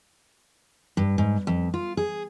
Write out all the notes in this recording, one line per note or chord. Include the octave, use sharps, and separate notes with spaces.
G2
G#2
F2
F4
G#4